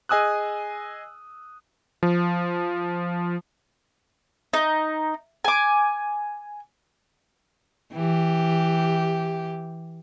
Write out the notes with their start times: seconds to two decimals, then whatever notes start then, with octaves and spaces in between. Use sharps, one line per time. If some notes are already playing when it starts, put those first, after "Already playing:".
0.09 G#4 D#5 G#5 D#6 E6 F#6
2.03 F3
4.53 D#4
5.45 G#5 D6
7.92 E3 G4